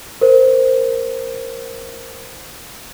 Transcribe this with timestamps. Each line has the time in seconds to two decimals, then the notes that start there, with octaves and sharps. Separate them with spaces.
0.21 A#4 C5